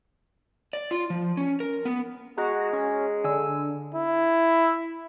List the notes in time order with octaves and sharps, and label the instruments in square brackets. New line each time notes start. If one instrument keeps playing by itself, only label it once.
[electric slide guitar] D5
F4
F3
C#4
A#4
B3
[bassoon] G#3 [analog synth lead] F#4 [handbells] D#5 A#5
[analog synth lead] C#4
[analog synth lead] D3 [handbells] G#5 E6
[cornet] E4